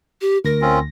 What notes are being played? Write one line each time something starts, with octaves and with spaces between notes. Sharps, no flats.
G4
D2 A#4 A#6
C4 C#4 F4